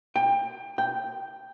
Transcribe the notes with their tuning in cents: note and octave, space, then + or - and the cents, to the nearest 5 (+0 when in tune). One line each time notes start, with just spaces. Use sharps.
G5 +25
G5 +0